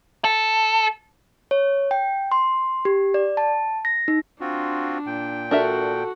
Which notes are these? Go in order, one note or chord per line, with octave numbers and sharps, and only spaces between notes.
A4
C#5
G5
C6
G4
D5
A5
A#6
D#4
C4 D4 F4 F#4
A#2 G5
D4 F#4 A4 A#4 E5